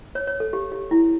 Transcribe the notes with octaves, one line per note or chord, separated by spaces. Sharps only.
C#5
C#5
A4
G4
G4
E4